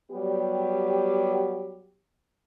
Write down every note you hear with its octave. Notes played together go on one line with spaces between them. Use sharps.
F#3 G3 B3 G4